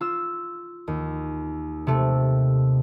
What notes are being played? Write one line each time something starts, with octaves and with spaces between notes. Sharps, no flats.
F4 E6
D#2
C3 A3